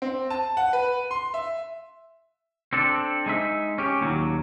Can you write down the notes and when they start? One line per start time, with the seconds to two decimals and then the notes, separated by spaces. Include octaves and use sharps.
0.02 C4
0.30 A5
0.57 F#5
0.73 B4
1.11 C6
1.34 E5
2.73 C4 D4 A4
3.26 G#3 D#4 E5
3.78 C#4 G4
4.01 D#2 A#2 F#3